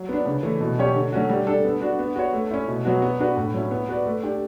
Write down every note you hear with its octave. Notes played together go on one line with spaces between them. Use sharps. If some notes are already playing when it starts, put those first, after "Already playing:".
Already playing: F#3
B3 D4
C#3
E3 A3
B2
F#3 C#4 G4 C#5
D3
F#3 A3 C#4 F#4
G3
D4 A4
B3
D4 F#4
B3
F#4 C#5
A3
C#4 E4
B2
F#3 B3 F#4
B3
D4 F#4 B4
A2
F#3 C#4 E4
B3
F#4 B4 D5
A3
D4 G4 D5